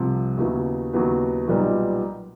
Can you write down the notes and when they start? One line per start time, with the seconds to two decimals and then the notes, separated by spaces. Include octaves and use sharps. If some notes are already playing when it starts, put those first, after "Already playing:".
Already playing: C2 C3 F3
0.37 D#2 C#3 F#3 B3 E4
0.93 D#2 C#3 F#3 B3 E4
1.48 B1 A#2 G3 B3 D#4